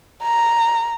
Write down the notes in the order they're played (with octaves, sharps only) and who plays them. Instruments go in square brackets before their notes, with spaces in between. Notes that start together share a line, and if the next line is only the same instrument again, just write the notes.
[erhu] A#5